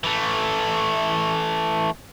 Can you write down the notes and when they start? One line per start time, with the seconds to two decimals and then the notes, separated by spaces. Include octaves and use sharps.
0.04 E3 A3